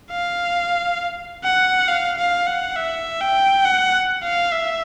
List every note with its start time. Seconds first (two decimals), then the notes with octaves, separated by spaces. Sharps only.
0.11 F5
1.43 F#5
1.88 F5
2.18 F5
2.47 F#5
2.76 E5
3.21 G5
3.65 F#5
4.23 F5
4.53 E5